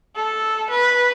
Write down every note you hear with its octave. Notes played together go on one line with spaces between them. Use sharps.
A4
B4